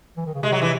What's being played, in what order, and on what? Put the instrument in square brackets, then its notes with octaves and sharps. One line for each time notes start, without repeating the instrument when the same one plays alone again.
[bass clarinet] E3
D#3
C#3
[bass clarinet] C3 [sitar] G#3
[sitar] F#3
E3